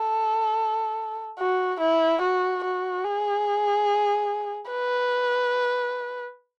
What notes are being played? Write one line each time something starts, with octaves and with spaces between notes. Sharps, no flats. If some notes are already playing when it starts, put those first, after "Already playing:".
Already playing: A4
F#4
E4
F#4
F#4
G#4
B4